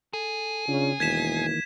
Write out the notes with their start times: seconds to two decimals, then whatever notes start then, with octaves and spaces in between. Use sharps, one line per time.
0.13 G#4 A4
0.68 C#3 D4 F4
1.00 E1 D#3 E3 A#3 G#6 B6 E7